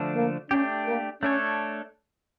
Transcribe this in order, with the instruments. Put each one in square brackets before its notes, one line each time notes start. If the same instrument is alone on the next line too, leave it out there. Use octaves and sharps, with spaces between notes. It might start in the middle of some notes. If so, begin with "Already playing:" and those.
Already playing: [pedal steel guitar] D3 F3 A3 D4
[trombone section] A#3
[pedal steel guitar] A3 D4 G4 [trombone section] C#4
[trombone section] A#3
[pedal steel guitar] A3 D4 A4 C#5 [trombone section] C#4